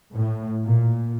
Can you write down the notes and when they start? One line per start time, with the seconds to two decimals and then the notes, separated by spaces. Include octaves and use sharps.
0.15 A2
0.65 A#2